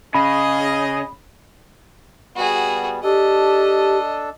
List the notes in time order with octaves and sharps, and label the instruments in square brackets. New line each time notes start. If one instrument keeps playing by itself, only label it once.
[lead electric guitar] C#3 [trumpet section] G#4 D#5 [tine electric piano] B5
[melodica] G3 B3 [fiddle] F#4 G#4
[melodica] D4 A4 [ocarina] G4 [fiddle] D#5